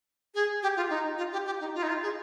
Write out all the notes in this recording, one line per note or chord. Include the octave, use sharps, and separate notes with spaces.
G#4
G4
F4
D#4
F4
G4
G4
D#4
F4
D#4
F4
G#4